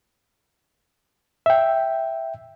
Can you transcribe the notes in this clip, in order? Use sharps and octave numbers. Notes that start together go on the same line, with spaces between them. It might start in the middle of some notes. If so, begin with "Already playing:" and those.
E5 G5